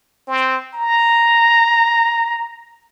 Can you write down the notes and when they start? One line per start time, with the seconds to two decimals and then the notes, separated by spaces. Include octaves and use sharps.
0.28 C4
0.74 A#5